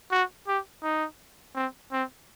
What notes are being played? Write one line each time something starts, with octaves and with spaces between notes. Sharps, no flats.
F#4
G4
D#4
C4
C4